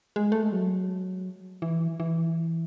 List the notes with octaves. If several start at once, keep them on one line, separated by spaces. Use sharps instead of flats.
G#3
A3
G#3
F#3
E3
E3